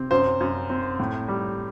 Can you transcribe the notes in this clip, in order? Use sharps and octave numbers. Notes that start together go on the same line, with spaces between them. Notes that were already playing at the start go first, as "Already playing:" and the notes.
Already playing: C3 C4
F#2 C5
F#2
C4
A2
G3